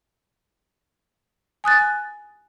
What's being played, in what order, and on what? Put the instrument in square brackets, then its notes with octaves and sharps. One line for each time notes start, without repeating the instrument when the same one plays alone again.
[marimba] G#5 D#6 F#6 A6